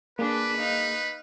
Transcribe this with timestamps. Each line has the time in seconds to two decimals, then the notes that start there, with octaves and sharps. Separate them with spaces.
0.19 A#3 D4 G#4 B4
0.58 D#4 F5